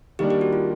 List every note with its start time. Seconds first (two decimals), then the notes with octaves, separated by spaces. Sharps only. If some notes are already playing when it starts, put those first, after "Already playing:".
0.19 D#3 G3 A#3 D4 G4
0.30 G4
0.41 F#4
0.53 F4